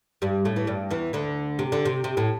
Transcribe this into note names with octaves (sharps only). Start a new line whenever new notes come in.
G2 G3
A2 A3
E3
G2 G3
E2 E3
D2 D3
C3
D3
C3
C3
A2